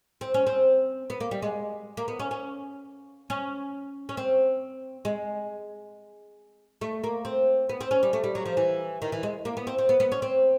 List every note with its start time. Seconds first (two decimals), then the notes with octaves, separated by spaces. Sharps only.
0.21 C4
0.34 C#4
0.47 C4
1.10 B3
1.20 A#3
1.31 G3
1.42 G#3
1.97 A#3
2.08 B3
2.20 C#4
2.31 C#4
3.30 C#4
4.09 C#4
4.17 C4
5.05 G#3
6.81 A3
7.04 A#3
7.25 C4
7.69 B3
7.81 C4
7.91 C#4
8.03 G3
8.13 A3
8.24 G3
8.35 F#3
8.46 F3
8.57 E3
9.02 D#3
9.12 E3
9.23 G#3
9.45 A#3
9.57 B3
9.67 C4
9.78 C4
9.89 B3
10.00 B3
10.12 C#4
10.22 C4